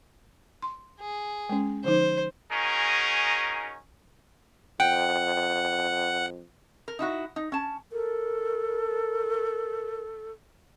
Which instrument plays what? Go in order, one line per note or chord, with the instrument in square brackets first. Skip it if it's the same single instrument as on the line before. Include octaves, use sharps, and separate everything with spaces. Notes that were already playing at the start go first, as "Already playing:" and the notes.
[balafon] C6
[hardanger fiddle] G#4
[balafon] G#3 C#4
[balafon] D3 F3 D#4 [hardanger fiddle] C5
[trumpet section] C#4 D#4 F#4 G#4 A#4
[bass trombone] F2 [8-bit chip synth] F#5 [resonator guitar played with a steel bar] G5
[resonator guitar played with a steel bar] A#4
D#4 E4 F#4
D#4
C#4 A5
[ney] A4 [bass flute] A#4